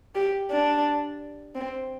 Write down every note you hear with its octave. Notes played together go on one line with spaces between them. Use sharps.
G4
D4
C4